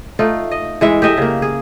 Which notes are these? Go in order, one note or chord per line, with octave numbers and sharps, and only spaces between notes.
A3 D#4 F4
D#5
E3 G#3 E5
G4 A4 D#5 E5
C#3 A#3
G#4